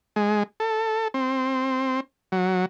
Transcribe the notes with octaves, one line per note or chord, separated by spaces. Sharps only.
G#3
A4
C4
F#3